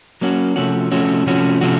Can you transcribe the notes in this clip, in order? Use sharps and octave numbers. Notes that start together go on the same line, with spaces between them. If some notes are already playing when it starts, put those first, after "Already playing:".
F#3 A#3 C#4 F#4
C3 F3 A3 C#4 F#4
C3 F3 A3 C#4 F#4
C3 F3 A3 C#4 F#4
C3 F3 A3 C#4 F#4